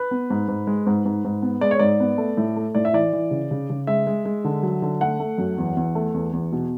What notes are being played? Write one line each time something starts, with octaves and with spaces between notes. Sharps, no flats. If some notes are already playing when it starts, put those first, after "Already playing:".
Already playing: B4
B3
G#2
G#2
G#3
G#2
G#2
G#2
B3
G#3 D5
C#5
G#2 D5
B3
A3
A2
A3
A2 D5
E5
E3 D5
E3
C#3
C#3
C#3
G#3 E5
G#3
G#3
D3
F#3
D3
A3 F#5
A3
F#2
E2
E2
A3
E2
E2
B2